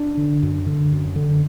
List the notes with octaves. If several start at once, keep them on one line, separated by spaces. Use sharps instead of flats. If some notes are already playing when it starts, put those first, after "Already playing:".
Already playing: D4
D3
F#2
D3
F#2
D3